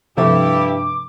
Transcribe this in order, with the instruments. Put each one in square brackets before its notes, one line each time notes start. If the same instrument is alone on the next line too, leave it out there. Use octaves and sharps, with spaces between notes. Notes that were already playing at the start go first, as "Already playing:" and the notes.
[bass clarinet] G2 [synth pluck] C3 F3 A3 [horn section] G3 E4 G4 [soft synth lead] D6